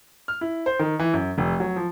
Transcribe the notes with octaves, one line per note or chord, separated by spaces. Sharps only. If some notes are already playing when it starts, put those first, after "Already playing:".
F6
E4
C5
D#3
E3
F#2
F1
F#3
F3